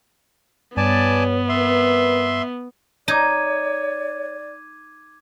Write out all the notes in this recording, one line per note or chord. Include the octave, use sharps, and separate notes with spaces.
G2 G3 B3 B4 C#5 D5 G#5 A5
C4 A#4 B4 E5 C6
D#4 C#5 D5 D6 G#6 D#7